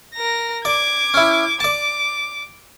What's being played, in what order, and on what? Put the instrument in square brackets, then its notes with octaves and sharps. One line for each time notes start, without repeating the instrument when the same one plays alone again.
[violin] A#4 A#6
[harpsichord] D5 [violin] D6 G#6
[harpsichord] C#4 E4
[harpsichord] D5 A5 [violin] D6